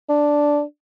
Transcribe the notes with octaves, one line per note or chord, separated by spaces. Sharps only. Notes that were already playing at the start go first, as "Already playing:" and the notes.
D4